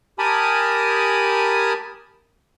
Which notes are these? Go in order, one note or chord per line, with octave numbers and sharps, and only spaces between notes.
G4 A#4 G#5 A5 B5 D#6